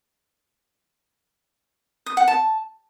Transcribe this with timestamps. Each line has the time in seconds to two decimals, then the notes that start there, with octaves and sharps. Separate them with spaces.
2.06 D#6
2.17 F#5
2.28 A5